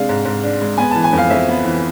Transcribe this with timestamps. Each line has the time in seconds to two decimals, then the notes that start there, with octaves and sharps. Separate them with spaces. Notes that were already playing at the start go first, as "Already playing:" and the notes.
Already playing: C3 G#3 D4 F5
0.09 G#2
0.25 G#2
0.44 D4
0.61 G#3
0.78 B3 G#5
0.91 A5
0.95 E3
1.04 G#5
1.13 F2 F5
1.30 F2 E5
1.49 B3
1.65 E3